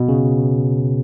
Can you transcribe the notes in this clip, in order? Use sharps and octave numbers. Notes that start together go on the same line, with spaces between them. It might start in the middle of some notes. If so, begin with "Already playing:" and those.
Already playing: B2
C#3